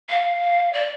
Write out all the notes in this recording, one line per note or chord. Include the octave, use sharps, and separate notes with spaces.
F5
D5